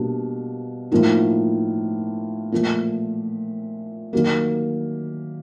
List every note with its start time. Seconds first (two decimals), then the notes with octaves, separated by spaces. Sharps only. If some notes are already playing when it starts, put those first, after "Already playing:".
Already playing: B2 G3 A#3 D4
0.92 A2 F3 A#3 D#4
2.52 A#2 F3 A3
4.13 D#3 F#3 A#3